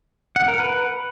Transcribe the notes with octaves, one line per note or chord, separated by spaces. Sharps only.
F#5
A#4
B4